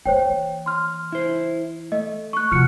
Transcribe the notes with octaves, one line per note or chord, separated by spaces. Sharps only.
E3 A#3 C5 C#5 G5
C6 F6
E4 C5
A3 D#5
C#6 F#6
C3 F3 F#4 F6 F#6 C#7